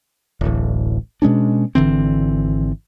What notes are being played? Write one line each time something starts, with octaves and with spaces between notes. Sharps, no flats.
D1 A1
B2 G#3 C#4 D4
G#1 D3 E3 C4